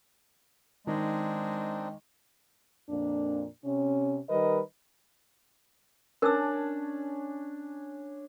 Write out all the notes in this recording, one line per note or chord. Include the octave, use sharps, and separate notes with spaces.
D#3 G#3 C4 D4 D#4
F2 A#2 A#3 D4
C3 C#4
D#3 G3 A#4 B4 D#5
C#4 D4 A#4 A5 E6